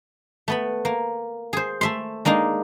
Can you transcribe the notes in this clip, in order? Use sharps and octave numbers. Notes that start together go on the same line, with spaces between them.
A3 B3 B5
A#3
G#4 C5
A3 E5 C6
G#3 A#3 D4 D#4